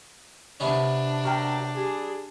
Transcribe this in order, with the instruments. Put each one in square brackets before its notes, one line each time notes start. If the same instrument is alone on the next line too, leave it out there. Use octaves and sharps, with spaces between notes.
[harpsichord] C3 B3 C#4 [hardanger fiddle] D4
[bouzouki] F#3 A#4 G5
[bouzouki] G3 [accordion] G#4